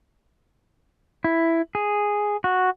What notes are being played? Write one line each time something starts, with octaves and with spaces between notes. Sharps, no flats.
E4
G#4
F#4